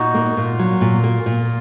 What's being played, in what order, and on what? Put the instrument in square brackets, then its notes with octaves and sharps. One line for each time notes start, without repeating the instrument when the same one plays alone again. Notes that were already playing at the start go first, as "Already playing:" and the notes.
Already playing: [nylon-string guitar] A#2 [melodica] D#4 F#4
[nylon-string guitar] A#3
[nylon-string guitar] A#2 [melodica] F4
[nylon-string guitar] F#3
A#2
A#3
A#2